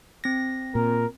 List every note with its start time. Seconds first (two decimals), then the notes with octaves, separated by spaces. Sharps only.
0.24 C4 A#6
0.75 A#2 A#4